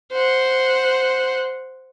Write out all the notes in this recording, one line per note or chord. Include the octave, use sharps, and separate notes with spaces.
C5 F#5